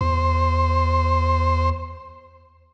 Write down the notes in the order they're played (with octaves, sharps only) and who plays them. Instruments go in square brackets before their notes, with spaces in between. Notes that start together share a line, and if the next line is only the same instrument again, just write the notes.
[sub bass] E2 [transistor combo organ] C5